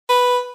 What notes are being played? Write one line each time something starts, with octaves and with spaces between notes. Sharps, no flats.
B4